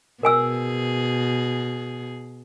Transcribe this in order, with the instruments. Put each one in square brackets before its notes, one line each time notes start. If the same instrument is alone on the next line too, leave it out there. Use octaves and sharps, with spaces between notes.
[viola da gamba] B2 G#4 [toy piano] A#4 G#5 E6